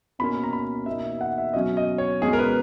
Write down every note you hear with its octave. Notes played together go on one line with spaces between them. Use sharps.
B2 A#3 C#4 B5
A#5
B5
B2 A#3 D#4 E5
E5
F#5
E5
B2 F#3 C#4 D#5
D#5
C#5
B2 G#3 C#4 G#4
A#4
B4